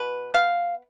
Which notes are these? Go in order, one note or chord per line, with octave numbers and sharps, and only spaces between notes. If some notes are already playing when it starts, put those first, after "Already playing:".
Already playing: B2 B4
B3 F5